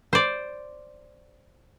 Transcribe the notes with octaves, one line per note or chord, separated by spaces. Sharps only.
C5 D5